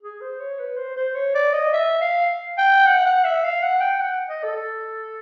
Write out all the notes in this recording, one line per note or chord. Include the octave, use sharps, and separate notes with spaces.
G#4
C5
C#5
B4
C5
C5
C#5
D5
D#5
E5
F5
G5
F#5
F#5
E5
F5
F#5
G5
F#5
D#5
A4